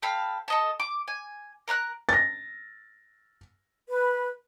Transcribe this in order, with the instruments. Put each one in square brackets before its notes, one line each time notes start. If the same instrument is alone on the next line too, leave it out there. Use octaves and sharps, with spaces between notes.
[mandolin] C4 A4 F5 B5
A4 D#5 A5
D6
G#5
A#4 A#5 F6 F#6
[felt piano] A6 A#6
[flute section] B4